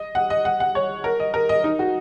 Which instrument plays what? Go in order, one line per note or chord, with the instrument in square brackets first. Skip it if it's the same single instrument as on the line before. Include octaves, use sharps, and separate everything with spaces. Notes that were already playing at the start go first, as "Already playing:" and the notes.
Already playing: [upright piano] D#5
F#5
D#5
F#5
F#5
C#5
A#4
D#5
A#4
D#5
D#4
F#4